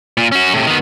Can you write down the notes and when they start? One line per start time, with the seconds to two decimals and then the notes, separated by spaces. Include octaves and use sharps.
0.17 A#2
0.32 C#4 F#4
0.54 A2 C3
0.67 D#3 B3